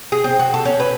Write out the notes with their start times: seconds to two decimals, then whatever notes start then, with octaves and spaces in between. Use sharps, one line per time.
0.12 G#4
0.24 C4
0.39 F#4
0.54 A4
0.65 C#4
0.80 B4